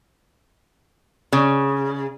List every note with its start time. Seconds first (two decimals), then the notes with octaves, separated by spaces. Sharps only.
1.33 C#3